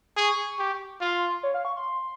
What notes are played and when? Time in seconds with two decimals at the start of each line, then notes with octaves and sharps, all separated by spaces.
0.17 G#4 C#6
0.59 G4
1.01 F4 C6
1.43 C#5
1.54 F5
1.65 C#6
1.76 C6